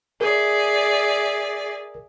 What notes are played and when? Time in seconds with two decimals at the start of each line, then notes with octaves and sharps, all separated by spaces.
0.21 G#4 A#4 D5 E5